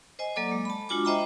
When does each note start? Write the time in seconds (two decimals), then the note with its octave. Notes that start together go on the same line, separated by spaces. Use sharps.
0.19 C5 D#5 G#5
0.36 F#3 A#3 A4 D5 D6
0.52 G#3
0.65 A5 B5
0.89 G#3 D4 F4 F#4 G#5 D6
1.05 C5 D#5 E5 G5 A#5 B5